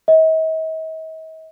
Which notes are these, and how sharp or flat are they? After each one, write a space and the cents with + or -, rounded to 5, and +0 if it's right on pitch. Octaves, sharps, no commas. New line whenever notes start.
D#5 +45